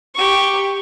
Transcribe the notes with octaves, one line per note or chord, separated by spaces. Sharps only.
G4 C#6